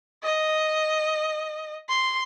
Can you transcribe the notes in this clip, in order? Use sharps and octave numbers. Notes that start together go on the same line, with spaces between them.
D#5
C6